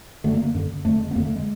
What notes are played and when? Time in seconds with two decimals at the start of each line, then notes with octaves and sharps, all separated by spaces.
0.24 F#2 D3 A3
0.34 A#3
0.44 A#3
0.54 F#2 D3
0.85 F2 D3 A3
1.00 G#3
1.11 B3
1.15 F2 D3 A#3
1.26 A3
1.36 G#3